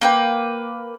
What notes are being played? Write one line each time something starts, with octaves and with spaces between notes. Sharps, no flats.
A#3 B4 G5